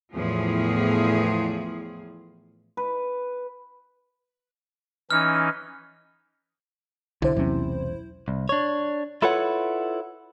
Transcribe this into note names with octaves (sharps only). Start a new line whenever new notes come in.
E2 A2 F3 G#4
B4
E3 C#4 D#4 F6
B1 D3 E4 C5
E1 B1 C3 C#4
C2
D4 C#5
E4 F4 A4 B4 C#5 F#5